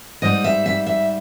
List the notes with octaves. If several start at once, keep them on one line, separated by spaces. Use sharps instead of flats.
G#2 G3 D#5
E5
E5
E5